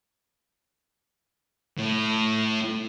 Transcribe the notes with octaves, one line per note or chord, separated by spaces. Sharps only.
A2